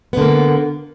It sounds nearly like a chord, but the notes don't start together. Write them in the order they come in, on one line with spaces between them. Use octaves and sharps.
B3 D3 A#3